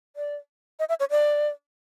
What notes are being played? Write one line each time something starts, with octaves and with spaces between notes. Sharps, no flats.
D5
D#5
E5
C#5
D5